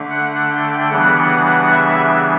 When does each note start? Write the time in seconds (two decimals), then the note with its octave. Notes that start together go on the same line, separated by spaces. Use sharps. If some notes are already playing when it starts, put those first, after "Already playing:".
Already playing: D3 A3 D4
0.10 F#5
0.51 G5
0.90 C#3 E3 G3 B3 D4 F#5
1.71 E5